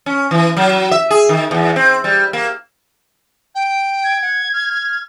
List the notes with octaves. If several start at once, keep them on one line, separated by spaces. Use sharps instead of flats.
C#4
E3
F#3
E5
G#4
D#3
E2
C4
G3
A#3
G5
G#6
F#5
F6